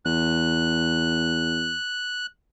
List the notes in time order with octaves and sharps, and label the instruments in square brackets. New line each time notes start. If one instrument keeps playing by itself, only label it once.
[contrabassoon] E2 [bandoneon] F#6